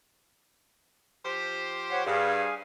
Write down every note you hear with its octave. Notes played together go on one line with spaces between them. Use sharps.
F3 G4 C5
C#5 F#5
G2 G#4 F5 G#5